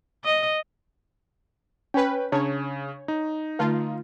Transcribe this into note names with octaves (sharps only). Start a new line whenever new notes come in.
D#5
C#4 B4 G5
C#3 D4 C#5 A5
D#4
D3 A3 F4 A5